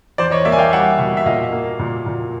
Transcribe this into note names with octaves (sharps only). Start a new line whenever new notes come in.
E2 C5 D5
C#5 D#5
A#3 D5 E5
G#5
F5 G5
G3 E5 F#5
B2
E5
A#2 D#5 F5
A#3
A#2
A#2